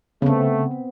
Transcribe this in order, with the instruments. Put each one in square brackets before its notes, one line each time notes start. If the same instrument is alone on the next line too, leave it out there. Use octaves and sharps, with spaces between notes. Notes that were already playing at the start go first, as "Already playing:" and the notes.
[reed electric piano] C#3 [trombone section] A3 [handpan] B3 C4